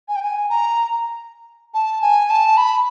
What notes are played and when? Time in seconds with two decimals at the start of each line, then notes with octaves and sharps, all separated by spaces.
0.08 G#5
0.16 G5
0.23 G#5
0.50 A#5
1.74 A5
2.02 G#5
2.30 A5
2.57 B5